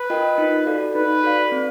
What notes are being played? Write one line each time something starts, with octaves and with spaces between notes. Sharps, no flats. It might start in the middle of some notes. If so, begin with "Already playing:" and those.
Already playing: B4
F4 A#4 D#5 G5
D#4
F#4 A4 D5 F5
D#4 B4
F#4 A4 D5 F5
C4